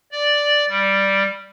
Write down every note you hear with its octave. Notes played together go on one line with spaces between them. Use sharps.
D5
G3